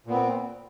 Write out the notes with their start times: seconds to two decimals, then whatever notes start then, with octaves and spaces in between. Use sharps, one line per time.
0.07 A#2
0.10 B3
0.14 C4